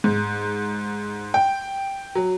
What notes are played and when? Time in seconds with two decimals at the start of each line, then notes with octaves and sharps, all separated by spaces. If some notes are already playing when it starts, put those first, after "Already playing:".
0.04 G#2
1.34 G5
2.15 F#3